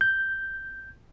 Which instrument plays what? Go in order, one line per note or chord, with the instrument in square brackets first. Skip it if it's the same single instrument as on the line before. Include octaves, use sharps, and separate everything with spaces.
[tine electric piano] G6